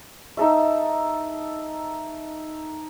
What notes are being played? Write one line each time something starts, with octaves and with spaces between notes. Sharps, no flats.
D#4 A4 E5